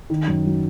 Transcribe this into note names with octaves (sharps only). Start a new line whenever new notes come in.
D#3
F#2
F#3